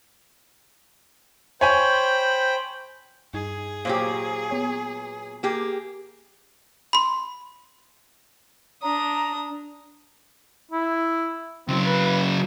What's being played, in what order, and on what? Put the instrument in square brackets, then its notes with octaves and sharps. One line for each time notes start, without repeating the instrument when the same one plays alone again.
[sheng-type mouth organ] C5 G5 B5 [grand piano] C#5 G#5
[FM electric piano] G2 D#4 G#6 [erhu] G#4
[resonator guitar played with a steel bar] A#2 F#3 G4 [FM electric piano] C5 F5
[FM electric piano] B3 C#5 G#6
[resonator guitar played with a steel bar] A#3 G4 G#4
[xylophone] B5 C6
[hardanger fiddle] D4 D#6 [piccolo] A#5
[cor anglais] E4
[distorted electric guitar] C#3 F#3 [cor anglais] C4
[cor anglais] B4